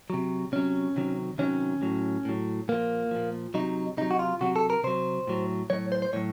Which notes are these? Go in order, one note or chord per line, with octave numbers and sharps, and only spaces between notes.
C3 F#3
C3 F#3 C#4
C3 D#3 F#3
C3 D#3 F#3 C#4
A2 F#3
A2 F#3
A#2 F3 A#3
A#2 F3
C3 F#3 D#4
C3 F#3 D#4
F#4
F4
C3 F#3 F#4
A4
A#4
C3 F#3 C5
A2 F#3
A2 F#3 C#5
C5
C5
A2 F#3 C#5